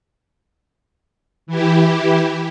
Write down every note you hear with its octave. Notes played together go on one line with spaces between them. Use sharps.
E3 E4 G4